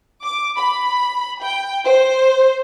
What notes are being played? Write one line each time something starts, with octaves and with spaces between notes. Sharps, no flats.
D6
B5
G5
C5